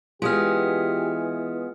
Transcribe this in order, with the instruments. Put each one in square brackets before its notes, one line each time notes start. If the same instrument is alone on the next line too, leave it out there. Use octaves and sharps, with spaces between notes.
[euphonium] E3 [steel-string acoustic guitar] G#3 B3 [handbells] F4 G#4 F6 [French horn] G4